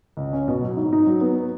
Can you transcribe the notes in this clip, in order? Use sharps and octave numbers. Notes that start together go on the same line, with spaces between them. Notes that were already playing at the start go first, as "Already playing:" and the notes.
C#2
C#4
B2
F#3
G#2
D#4
F#3
B3